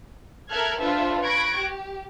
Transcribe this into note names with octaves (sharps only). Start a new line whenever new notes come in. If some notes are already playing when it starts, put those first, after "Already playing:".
A4 A#4 E5 F6 F#6 G#6
D4 F4 A4 B4 C5 E5
B5 C#6 F#6 G#6 A#6 D7
G4